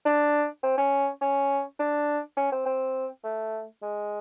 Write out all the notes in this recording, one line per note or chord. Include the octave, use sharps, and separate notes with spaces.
D4
C4
C#4
C#4
D4
C#4
C4
C4
A3
G#3